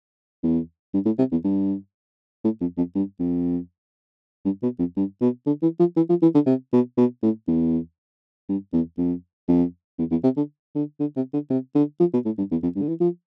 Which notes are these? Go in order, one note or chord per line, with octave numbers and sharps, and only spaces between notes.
E2
G2
A2
C3
E2
G2
A2
F2
F2
G2
F2
G2
B2
F2
G2
B2
D3
E3
F3
E3
F3
E3
D3
C3
B2
B2
A2
E2
G2
E2
F2
F2
E2
E2
C3
D3
D3
D3
C3
D3
C3
D3
F3
B2
A2
G2
E2
F2
G2
D3
E3
F3